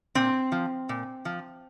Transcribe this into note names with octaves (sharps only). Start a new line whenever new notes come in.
A#2 C4
F3
A#2
F3